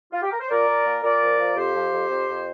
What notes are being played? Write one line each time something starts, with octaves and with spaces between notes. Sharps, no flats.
F4
G4
A#4
C5
A#2 A#4 D5
A#2
A#2
A#2 A#4 D5
F3
F3
F2 G4 C5
F3
F2
F2
F2